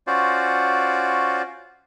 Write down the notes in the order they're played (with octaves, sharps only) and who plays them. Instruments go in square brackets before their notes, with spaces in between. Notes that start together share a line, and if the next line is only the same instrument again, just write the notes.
[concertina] C#4 F4 F#4 C5 D5